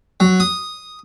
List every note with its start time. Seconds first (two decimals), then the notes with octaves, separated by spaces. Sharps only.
0.20 F#3
0.40 D#6